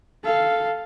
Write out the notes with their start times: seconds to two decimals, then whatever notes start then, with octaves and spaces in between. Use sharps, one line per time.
0.25 A4 F5